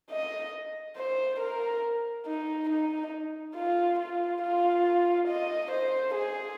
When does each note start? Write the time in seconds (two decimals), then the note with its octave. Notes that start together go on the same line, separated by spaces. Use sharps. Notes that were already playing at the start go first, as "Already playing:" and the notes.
0.11 D#5
0.97 C5
1.40 A#4
2.26 D#4
2.69 D#4
3.56 F4
3.99 F4
4.42 F4
5.28 D#5
5.71 C5
6.15 G#4